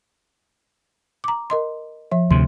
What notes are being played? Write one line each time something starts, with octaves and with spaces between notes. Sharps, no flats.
A#5 D6
A#4 D#5 C6
F3 E5
D2 C3 C6